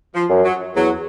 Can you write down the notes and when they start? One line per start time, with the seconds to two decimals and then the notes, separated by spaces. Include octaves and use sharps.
0.15 F3
0.29 F#2
0.45 F#3
0.75 E2 F#3